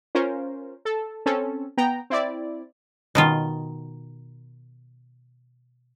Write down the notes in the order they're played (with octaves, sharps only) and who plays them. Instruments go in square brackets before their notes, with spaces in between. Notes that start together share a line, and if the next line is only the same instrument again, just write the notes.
[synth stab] C#4 F4 A#4 C5
A4
C4 C#4 A4
B3 G5 A#5
C4 E4 D5
[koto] B2 D#3 F4